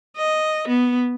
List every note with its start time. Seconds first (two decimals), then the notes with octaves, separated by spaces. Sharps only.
0.17 D#5
0.67 B3